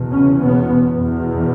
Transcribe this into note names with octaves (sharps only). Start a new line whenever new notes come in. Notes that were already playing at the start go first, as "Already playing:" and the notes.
Already playing: E2 B2
C#3 C#4
B2 B3
E2 B2